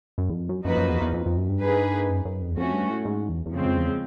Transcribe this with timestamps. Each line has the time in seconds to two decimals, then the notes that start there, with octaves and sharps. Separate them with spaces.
0.18 F#2
0.30 E2
0.33 F2
0.49 F#2
0.65 F#2 F3 A#3 D#4 F#4 B4
0.77 F#2
0.90 E2
1.01 E2
1.14 F2
1.26 F2
1.37 F#2
1.49 G2
1.62 A#3 D#4 G#4 B4
2.10 F#2
2.25 F#2
2.42 F2
2.51 E2
2.57 F2 A3 C#4 F#4
2.73 G2
2.89 A2
3.05 G#2
3.29 E2
3.46 E2
3.52 F2 C#3 F3 G#3 C4
3.65 F2
3.77 E2